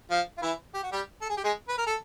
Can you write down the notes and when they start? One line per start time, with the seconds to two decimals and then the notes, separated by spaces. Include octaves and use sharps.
0.11 F3 F4
0.37 F4
0.42 E3 E4
0.74 G4
0.83 F#4
0.92 G3 G4
1.21 A4
1.30 G#4
1.37 G4
1.44 G#3 G#4
1.68 B4
1.78 A#4
1.87 A4